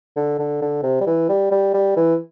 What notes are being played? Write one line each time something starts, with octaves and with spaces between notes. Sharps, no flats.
D3
D3
D3
C3
G3
E3
G3
G3
G3
E3